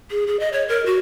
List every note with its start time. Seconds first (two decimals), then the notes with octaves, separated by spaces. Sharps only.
0.11 G#4
0.27 G#4
0.40 D#5
0.53 C#5
0.68 A#4
0.86 F#4